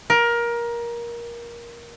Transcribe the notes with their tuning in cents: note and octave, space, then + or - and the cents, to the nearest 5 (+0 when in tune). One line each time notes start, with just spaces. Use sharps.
A#4 +20